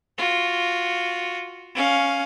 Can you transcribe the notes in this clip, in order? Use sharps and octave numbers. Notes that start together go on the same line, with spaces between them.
F4 F#4
C#4 F5